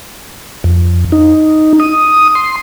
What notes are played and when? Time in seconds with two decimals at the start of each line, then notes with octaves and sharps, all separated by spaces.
0.64 F2
1.12 D#4
1.80 D#6
2.35 C6